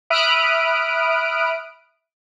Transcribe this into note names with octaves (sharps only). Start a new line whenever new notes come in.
E5 B5 D#6 F6 F#6 D7